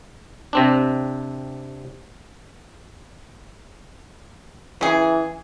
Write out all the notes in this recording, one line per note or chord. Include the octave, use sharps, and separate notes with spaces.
C3 C4 D4
C#3 E3 G#4